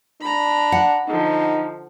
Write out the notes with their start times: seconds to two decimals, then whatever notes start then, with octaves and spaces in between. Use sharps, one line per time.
0.21 D4 A#5 B5
0.72 F#5
1.08 D3 F3 D#4